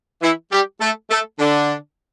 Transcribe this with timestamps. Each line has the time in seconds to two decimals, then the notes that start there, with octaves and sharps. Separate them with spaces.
0.22 E3 E4
0.52 G3 G4
0.81 A3 A4
1.10 A3 A4
1.39 D3 D4